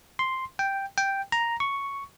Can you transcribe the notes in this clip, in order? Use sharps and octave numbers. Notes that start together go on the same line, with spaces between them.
C6
G5
G5
A#5
C#6